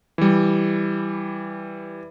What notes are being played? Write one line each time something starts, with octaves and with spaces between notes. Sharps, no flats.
E3 G3